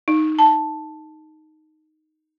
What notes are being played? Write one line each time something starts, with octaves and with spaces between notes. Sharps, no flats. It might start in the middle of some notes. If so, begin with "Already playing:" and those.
D#4
A5